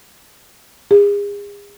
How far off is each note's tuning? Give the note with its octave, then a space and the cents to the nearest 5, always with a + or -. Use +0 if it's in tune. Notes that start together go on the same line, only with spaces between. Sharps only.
G#4 -35